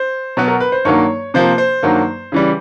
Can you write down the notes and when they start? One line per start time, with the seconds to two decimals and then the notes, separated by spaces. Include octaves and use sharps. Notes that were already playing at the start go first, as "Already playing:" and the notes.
Already playing: C5
0.37 B2 F#3 B3
0.48 A#4
0.60 B4
0.72 C5
0.85 G2 D#3 F#3 A#3 C#5
1.34 C3 F3 A#3 C5
1.58 C5
1.83 G2 D#3 F#3 A#3
2.32 C#3 E3 G3